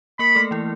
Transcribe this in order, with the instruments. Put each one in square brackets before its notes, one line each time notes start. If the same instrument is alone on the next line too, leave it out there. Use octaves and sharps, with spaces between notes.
[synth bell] A#3 A#4 [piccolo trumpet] B5
[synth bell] A3 A4
E3 E4